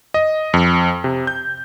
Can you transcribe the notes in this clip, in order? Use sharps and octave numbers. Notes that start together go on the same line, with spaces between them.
D#5
F2
C3
G6